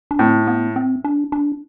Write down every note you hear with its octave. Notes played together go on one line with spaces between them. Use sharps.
D4
A2 C4
B3
C4
D4
D4